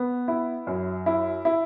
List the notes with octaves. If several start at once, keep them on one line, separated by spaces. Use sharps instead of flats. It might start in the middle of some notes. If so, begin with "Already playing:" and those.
Already playing: B3
E4
F#2
E4
E4